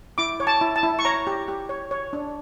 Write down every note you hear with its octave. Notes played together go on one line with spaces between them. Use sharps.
E4 D6
C#5
A5
E4
A5
E4
C#6
C#5 A#5
G4
G4
C#5
C#5
D4